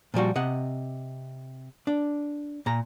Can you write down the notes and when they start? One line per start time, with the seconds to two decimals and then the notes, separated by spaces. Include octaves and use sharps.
0.14 A#2 F3 G3 F#4
0.35 C3 D#5 F#5
1.87 D4
2.66 A#2 A#5